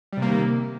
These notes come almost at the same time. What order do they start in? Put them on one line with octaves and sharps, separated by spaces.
G3 C3 A#3 D#3